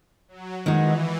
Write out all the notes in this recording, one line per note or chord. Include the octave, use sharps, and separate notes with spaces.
F#3
D#3 E3 G#3 D#4 F#4